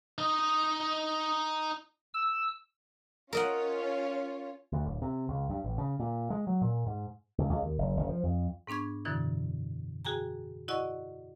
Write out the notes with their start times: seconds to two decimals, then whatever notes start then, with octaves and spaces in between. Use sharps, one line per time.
0.18 D#4 D#5
2.14 E6
3.33 C#4 F4 A#4 C#5 D#5 F#5
4.72 D2
4.85 D1
5.02 C3
5.29 C#2
5.50 G2
5.64 A1
5.78 C#3
6.00 A#2
6.30 G#3
6.47 F#3
6.62 A#2
6.86 G#2
7.38 C#2
7.49 C#2
7.62 D#2
7.78 F#1
7.96 F#1
8.09 F3
8.23 F2
8.67 G#2 B3 D4 C#6 G#6
9.05 F#2 B2 D3 E3 E4
10.05 F#4 G#4 G5 G#5 A#5
10.68 E4 F#4 D5 D#5 F#5 C#6